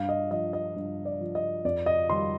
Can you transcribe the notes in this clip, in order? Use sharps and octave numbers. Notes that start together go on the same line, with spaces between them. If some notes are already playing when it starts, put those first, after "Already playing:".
Already playing: G2 F5
D#5
F3 D#5
D#5
G2
D5
F3
D#5
F2 D5
D#5
D#3 G3 C6